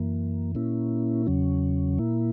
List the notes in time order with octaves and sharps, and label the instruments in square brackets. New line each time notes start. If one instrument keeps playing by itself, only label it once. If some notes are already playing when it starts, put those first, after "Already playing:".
Already playing: [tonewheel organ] F#2 E3 A#3
A#2 A#3 C#4 E4
E2 C#3 F#3 C#4
A#2 A#3 E4